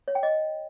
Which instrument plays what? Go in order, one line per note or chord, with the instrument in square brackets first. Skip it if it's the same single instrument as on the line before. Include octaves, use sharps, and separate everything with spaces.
[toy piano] C#5
G5
D#5